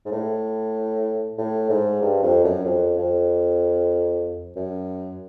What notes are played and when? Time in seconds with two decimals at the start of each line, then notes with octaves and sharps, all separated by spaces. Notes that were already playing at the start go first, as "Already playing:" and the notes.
0.06 G#2
0.12 A2
1.39 A2
1.70 G#2
2.02 G2
2.23 F2
2.44 F#2
2.65 F2
2.98 F2
4.56 F#2